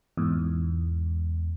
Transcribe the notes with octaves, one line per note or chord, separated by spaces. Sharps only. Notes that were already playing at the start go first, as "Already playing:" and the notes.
E2 G#2